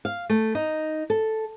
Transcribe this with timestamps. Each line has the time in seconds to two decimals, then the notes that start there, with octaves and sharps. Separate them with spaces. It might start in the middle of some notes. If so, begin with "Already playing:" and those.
0.05 F5
0.30 A3
0.55 D#4
1.10 A4